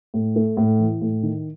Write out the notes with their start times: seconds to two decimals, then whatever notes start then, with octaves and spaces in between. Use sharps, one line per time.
0.14 A2
0.36 A3
0.57 A2
0.79 E3
1.01 A2
1.23 D#3